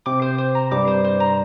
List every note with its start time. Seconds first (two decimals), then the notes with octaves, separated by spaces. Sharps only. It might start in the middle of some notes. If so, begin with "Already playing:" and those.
0.06 C3 C4 D6
0.22 C5
0.38 C5
0.55 A#5
0.71 G2 G3 D6
0.88 C5
1.04 C5
1.20 A#5